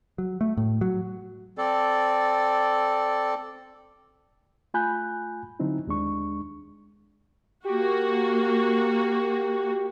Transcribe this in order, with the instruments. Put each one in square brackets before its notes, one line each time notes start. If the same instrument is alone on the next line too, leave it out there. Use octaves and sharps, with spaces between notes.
[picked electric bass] F#3
A3
A2
F#3
[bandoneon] C4 A4 D5
[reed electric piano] A3 F4 G#5 B5 F#6 G6
D3 F#3 C4 D#4 E4
D#2 G#3 D4 C#6
[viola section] A#3 F#4 [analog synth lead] G4